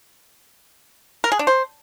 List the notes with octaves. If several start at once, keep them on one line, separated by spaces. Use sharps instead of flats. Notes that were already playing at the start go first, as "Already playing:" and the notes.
A#4
G#4
D4
C5